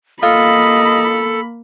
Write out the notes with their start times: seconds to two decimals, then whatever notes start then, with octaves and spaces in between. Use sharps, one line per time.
0.22 A#3 F4 A4 D#5 B5